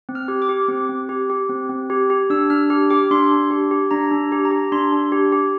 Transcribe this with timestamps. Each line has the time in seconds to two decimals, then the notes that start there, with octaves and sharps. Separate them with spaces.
0.09 C4
0.15 F6
0.28 G4
0.42 D6
0.49 G4
0.68 C4
0.89 C4
1.09 G4
1.30 G4
1.49 C4
1.69 C4
1.90 G4
2.10 G4
2.30 D4 E6
2.50 D4 F6
2.70 G4 F6
2.90 G4 D6
3.11 D4 C6
3.31 D4
3.51 G4
3.71 G4
3.91 D4 A#5
4.12 D4
4.32 G4
4.45 A#5
4.51 G4
4.72 D4 C6
4.92 D4
5.12 G4
5.32 G4